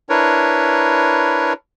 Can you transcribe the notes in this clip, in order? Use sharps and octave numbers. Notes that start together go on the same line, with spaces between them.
D4 E4 A#4 B4 C#5